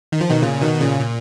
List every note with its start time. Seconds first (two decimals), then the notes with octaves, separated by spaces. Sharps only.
0.12 D#3
0.21 F3
0.30 B2 D#3
0.42 A#2 C#3
0.62 B2 D#3
0.81 A#2 C#3
1.00 A#2